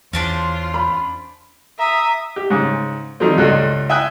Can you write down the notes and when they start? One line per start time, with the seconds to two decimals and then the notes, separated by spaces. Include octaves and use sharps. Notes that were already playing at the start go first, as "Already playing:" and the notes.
0.13 E2 C#4 D4 F4 C5
0.74 B5
1.78 E5 A#5 D#6
2.36 G4
2.50 G#2 C#3
3.20 D#3 F3 G3 A3 C4
3.38 C#2 G2 A3 D#5
3.89 E5 G5 G#5 D#6 E6 F#6